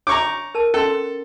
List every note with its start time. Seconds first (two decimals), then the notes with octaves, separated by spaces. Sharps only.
0.07 D4 C#5 A#5 C#6 D6
0.55 A#4 A5
0.74 C#4 A4 C6